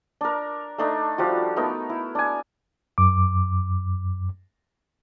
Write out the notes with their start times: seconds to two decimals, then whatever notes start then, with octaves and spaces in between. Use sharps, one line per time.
0.21 D4 A#4
0.78 A3 D4 D#4
1.18 F3 G3 F#4
1.56 A3 B3 D#4 A#4
1.90 E4
2.15 D4 G#5
2.98 F#2 D6